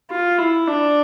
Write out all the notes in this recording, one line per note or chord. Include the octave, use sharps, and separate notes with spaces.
F4
E4
D4